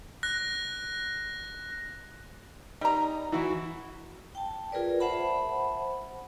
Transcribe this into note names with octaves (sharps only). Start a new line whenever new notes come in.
F#6 A#6
G3 D#4 A#5
E3 E4 F#4
G5 A5
F4 G#4 A#4 B4 D5
C5 E5 F#5 A5 B5